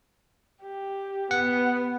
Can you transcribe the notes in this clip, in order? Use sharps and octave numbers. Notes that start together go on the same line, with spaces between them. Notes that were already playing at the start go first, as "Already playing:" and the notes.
G4
B3 F#5